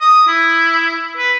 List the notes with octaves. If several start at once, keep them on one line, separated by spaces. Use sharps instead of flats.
D#6
E4
B4